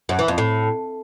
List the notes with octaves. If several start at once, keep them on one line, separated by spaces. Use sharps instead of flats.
F#2
E3
F2
A2